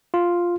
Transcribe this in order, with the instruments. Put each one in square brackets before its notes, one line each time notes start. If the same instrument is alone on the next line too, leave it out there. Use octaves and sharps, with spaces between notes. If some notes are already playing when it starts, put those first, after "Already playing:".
[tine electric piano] F4